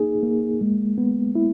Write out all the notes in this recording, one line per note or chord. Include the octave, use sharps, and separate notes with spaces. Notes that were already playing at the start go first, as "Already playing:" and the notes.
Already playing: A#3 D#4 G#4
A#3
G#3
B3
E4